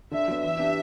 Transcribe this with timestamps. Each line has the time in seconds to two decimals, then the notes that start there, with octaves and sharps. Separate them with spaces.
0.11 D3 E5
0.28 F#3 B3
0.43 E3 E5
0.59 B3 D4 G4